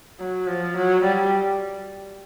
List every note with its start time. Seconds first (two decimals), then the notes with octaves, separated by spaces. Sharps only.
0.20 F#3
0.48 F3
0.77 F#3
1.04 G3